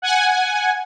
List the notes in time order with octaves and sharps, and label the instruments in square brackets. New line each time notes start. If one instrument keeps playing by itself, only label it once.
[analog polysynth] F#5 G#5